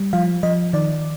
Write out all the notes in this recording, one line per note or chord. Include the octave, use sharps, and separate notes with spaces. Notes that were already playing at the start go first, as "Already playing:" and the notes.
Already playing: G3
F3 F5
F3 D#5
D#3 D5